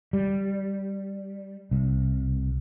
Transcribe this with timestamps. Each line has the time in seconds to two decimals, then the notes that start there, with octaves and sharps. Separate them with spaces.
0.13 G3
1.71 C2